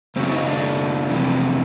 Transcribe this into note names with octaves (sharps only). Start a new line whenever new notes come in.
F#2 C#3 F#3 C4
D#4
D4
F2 C3 E3